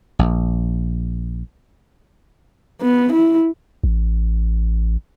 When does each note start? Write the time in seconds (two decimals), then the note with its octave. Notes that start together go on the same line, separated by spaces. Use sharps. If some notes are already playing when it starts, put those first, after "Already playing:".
0.19 A#1
2.81 B3
3.13 E4
3.84 A1